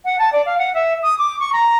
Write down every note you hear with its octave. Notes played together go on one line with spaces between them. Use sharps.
F#5
A5
D5
F5
F#5
E5
D#6
D6
C#6
A#5